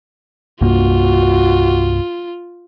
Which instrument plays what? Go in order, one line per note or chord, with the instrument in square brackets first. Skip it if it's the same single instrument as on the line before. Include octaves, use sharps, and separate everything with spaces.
[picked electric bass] C2 G2 A#3 [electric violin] F4 [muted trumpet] F#4